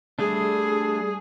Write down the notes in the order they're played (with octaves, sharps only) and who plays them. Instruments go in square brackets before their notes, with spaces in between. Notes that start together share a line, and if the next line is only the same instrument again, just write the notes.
[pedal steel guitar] G3 A3 D4 [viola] G#4